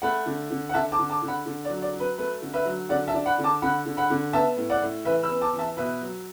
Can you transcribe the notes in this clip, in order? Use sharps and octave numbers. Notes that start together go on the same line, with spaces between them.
A3 F#5 B5
D3
D3
F#5
D3 E5 A5
A5 D6
D3
A5 D6
D3
F#5 B5
D3
D5
F#3
D5
F#3
B4
A3 B4
D3
B4 E5
F#3
D3 D5 F#5
E5 A5
D4
F#5 B5
D3
A5 D6
D3 F#5 B5
D3
F#5 B5
D3
B3 E5 A5
A2
D5 F#5
A2
E3 B4 E5
B5 E6
B3
A5 D6
E3
E5 A5
B2 B4 E5
F#3